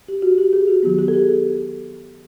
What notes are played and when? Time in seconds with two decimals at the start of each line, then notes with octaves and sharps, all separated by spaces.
0.08 G4
0.22 F#4
0.38 G4
0.53 G#4
0.68 F#4
0.83 D#3 F#3 B3 G4
0.98 G4
1.08 A4
1.14 G#4